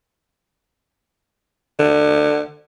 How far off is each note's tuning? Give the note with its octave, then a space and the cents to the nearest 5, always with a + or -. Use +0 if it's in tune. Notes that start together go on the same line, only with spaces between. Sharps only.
D3 +25